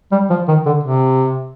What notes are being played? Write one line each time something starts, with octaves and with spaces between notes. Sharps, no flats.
G3
F3
D#3
D3
C3